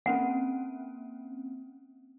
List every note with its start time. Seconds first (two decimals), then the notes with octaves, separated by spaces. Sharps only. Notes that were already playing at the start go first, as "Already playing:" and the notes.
0.06 A#3 C4 C#4 F#5